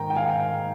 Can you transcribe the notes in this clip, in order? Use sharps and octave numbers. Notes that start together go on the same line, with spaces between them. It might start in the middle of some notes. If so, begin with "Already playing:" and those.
Already playing: G#2 D#3 G#3 G5 A#5
G5
F5 G#5